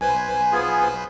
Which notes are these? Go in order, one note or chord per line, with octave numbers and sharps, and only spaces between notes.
B1 B4 C5 G#5
B3 F4 G#4